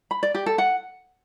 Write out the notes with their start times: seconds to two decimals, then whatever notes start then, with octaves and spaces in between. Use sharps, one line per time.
0.11 B5
0.23 D5
0.35 G4
0.46 A4
0.58 F#5